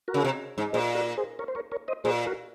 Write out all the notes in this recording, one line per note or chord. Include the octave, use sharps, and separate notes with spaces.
F#4 A#4
C#3
C3
G#2
A#2 G#4 C5
F#4 A#4
G#4 C5
A#4 C#5
C5
A#4 C#5
A#4 C#5
C5 D#5
A#2 G#4 C5
F#4 A#4